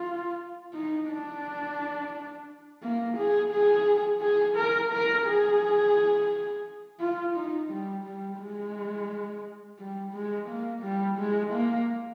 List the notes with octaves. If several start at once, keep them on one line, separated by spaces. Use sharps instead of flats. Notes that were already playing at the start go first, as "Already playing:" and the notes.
Already playing: F4
D#4
D4
A#3
G#4
G#4
G#4
A#4
A#4
G#4
F4
D#4
G3
G3
G#3
G3
G#3
A#3
G3
G#3
A#3